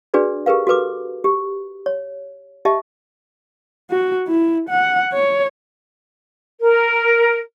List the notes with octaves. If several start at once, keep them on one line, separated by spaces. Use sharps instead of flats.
D4 F#4 G#4 B4 D5
G4 G#4 A#4 B4 F5
F#4 A4 B4 D6
G4
C#5
G4 D#5 E5 A5
F#4
E4
F#5
C#5
A#4